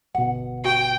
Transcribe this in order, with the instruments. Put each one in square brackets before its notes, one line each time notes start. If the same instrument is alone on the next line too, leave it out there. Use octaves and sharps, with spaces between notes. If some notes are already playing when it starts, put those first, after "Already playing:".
[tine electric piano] G1 B2 [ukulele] F#5
[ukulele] F#4 [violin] G5